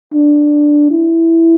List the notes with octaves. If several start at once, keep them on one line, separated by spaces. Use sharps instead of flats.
D4
E4